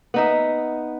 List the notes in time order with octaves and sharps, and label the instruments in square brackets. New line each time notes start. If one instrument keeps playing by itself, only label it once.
[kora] B3 D#4 E5